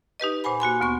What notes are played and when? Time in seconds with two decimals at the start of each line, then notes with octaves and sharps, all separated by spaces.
0.20 D#4 G4 B4 D#5
0.44 A#2 C5 F#5 G#5 B5
0.60 A#3 F#4 G#5 C6
0.80 D2 B3 C#6